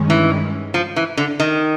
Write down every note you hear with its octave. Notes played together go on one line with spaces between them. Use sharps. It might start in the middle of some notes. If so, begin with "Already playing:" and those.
Already playing: G2 D#3 G#3 C#4
E3
F3
E3
D3
D#3